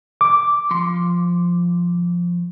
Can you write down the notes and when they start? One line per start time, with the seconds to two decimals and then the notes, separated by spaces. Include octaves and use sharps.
0.21 D6
0.71 F3 C6